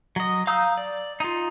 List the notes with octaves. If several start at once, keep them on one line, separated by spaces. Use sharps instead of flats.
F#3 D#5
F5 A#5 D#6 E6 G6
D5
D#4 F4